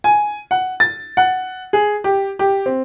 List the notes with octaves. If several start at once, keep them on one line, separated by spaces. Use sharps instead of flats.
G#5
F#5
A6
F#5
G#4
G4
G4
C4